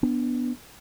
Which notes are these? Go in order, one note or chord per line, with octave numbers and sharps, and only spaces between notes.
B3 D4